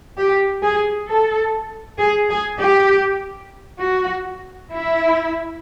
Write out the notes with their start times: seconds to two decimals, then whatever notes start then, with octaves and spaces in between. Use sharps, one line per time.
0.18 G4
0.62 G#4
1.08 A4
1.98 G#4
2.29 G#4
2.59 G4
3.80 F#4
4.71 E4